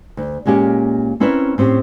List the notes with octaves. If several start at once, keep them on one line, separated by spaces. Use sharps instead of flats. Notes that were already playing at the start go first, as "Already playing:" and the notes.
D2
A#2 G#3 A#3 C#4 G4
C4 C#4 E4 A#4 B4 E5
A2 C4 C#4 G4